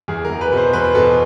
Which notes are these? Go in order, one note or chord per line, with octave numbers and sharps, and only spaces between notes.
E2 G#4
A#4
E2
B4
B2 C5
E2 B4
B2 A4